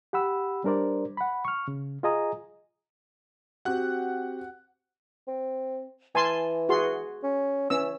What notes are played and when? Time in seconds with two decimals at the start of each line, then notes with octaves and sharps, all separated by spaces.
0.13 G4 F#5 B5 E6
0.64 G3 D4 A#4 C5 D5
1.17 F#5 B5
1.45 C#6 F6
1.68 C#3
2.03 F4 G#4 D#5 G#5 A#5 D#6
3.65 C4 F#4 G4 F#5 F#6
5.28 C4
6.15 E3 G#5 A5 C6
6.69 F#4 G#4 C6
7.23 C#4
7.70 E3 C#4 E6